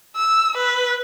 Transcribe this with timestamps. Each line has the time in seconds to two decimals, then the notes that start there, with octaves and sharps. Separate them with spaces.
0.16 E6
0.57 B4